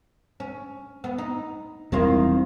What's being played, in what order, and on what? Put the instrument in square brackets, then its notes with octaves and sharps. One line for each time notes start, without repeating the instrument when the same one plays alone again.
[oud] C#4
B3
D#4
[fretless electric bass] E1 G3 C4 [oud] D#3 E4 F4